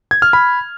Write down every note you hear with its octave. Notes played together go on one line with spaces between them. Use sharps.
G#6
F6
B5